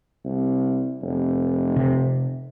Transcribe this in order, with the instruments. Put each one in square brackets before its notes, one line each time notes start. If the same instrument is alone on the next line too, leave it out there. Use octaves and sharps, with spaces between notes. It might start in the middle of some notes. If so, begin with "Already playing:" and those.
[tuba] C2
F1
[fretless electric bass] C3